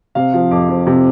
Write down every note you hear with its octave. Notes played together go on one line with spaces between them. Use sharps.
C3 F5
F3
F2 D6
F2
C3